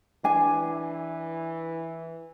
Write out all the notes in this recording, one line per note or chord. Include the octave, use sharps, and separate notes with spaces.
E3 D4 G#5